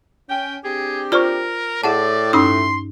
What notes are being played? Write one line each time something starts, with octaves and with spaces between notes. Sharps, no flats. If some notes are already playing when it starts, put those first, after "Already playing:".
C#4 G5
C4 D4 G4 G#4
F4 A#4 C5 D5 C#6 F6
A2 G#4 D5 F#5 A5
G2 C#4 D#4 C6 E6